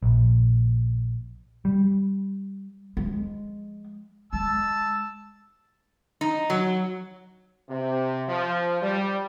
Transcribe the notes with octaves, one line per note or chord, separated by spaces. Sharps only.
A#1
G3
F3 G#3
G#3 A5 E6
D#4
F#3
C3
F3
G3